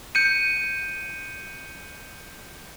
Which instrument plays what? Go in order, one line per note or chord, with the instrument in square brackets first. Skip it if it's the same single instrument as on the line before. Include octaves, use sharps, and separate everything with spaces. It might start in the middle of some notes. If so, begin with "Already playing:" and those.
[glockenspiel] G6 C#7 D#7